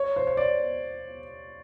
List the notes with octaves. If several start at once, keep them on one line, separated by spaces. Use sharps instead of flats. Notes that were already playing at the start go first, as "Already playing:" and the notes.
Already playing: C#5
C5
C#5
D5